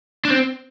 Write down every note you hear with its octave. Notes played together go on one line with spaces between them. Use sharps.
D4
C4